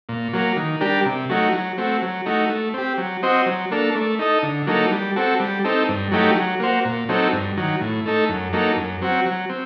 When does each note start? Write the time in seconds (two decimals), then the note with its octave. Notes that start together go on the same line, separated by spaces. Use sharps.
0.09 A#2
0.33 F#3 A#3
0.57 D#3
0.81 G3 D4 G4 A#4
1.06 C3
1.29 F#3 A3 D#4 F#4
1.53 F#3
1.78 A3 C4 F#4
2.02 F#3
2.26 A3 D#4 F#4
2.49 A3
2.74 C4 G4
2.98 F#3
3.23 C4 F#4 C5 D#5
3.46 F#3
3.71 A#3 D4 A4
3.95 A3
4.19 D#4 A4 D#5
4.43 D3
4.67 F#3 A#3 D#4 A4
4.92 G3
5.16 C4 F#4 A4
5.40 G3
5.64 C4 D#4 A4
5.89 G2
6.11 F#3 A3 D#4 G4
6.36 F#3
6.60 A#3 F#4 C5
6.85 A#2
7.09 F#3 C4 D#4 A4
7.32 G2
7.57 D#3 F#3
7.81 A2
8.06 A3 D#4 A4
8.29 F#2
8.53 F#3 A#3 D#4 A4
8.77 F#2
9.01 F#3 C4 F#4
9.26 F#3
9.49 C4